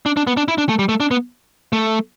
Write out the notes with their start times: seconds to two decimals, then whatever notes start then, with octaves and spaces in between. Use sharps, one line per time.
0.06 D4
0.17 D4
0.27 B3
0.37 D4
0.48 E4
0.58 D4
0.69 A3
0.79 G3
0.89 A3
1.00 D4
1.11 B3
1.73 A3